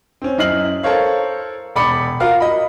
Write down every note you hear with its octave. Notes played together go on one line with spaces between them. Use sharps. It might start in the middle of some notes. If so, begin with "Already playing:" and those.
C4 C#4
F#2 E4 D#5 F6 C7 F#7
A4 A#4 C5 C#5 F5
E1 D5 B5 D6 C#7
F4 F#4 A#4 F5
D#5 B5